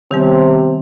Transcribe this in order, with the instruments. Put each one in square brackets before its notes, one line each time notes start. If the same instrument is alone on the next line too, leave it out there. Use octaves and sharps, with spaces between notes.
[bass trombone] C3 [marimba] D#3 G3 B3 [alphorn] C4